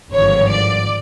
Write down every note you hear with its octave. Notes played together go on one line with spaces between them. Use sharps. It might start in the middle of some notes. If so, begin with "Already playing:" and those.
G#1 G2 D3 F3 C#5
D5